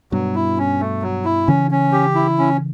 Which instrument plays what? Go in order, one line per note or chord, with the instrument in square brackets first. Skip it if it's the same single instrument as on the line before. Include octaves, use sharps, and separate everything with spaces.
[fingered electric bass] G2 B2 [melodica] F#3
[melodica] E4
C#4
A3
F#3
E4
[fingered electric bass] C#3 E3 [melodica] C#4
[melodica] C#4
G4
E4
C#4